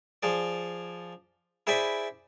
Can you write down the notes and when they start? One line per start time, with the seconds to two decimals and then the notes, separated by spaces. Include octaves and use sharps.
0.23 F3 G#4 D5
1.67 E4 G#4 C5 D5 G#5 B5